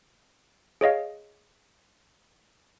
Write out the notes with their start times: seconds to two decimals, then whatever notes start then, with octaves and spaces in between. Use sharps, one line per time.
0.81 G#4 C#5 D#5 F5